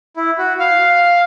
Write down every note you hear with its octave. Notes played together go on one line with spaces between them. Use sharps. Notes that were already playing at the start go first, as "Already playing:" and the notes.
E4
F#4
F5